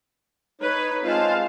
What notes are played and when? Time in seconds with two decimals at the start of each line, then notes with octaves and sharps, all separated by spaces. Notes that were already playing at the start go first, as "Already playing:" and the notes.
0.61 D#4 B4 C#5
1.04 G#3 C4 F4 F5 A5